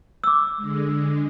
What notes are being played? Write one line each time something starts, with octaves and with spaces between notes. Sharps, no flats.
D6 E6
D3 G#3